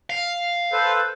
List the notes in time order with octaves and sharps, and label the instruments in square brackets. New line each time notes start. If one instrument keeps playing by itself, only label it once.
[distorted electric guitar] F5
[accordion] A4 B4 C5